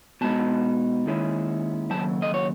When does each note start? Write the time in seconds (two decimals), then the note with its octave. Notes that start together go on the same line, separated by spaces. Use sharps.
0.21 B2 G#3 D#4 A5
1.06 D#2 D#3 G#3 C#4 E4
1.91 D#2 C#3 F#3 A5
2.22 D#5
2.34 C#5